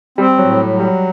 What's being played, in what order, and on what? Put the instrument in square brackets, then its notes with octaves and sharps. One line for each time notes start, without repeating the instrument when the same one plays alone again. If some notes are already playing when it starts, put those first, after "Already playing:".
[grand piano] G3 [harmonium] C4
[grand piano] F#3
[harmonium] A2
F#3
[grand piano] G3